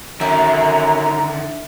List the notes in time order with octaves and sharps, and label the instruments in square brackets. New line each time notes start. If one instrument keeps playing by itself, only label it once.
[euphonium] F#2 [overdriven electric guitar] D3 D#3 [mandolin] E4 [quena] A#5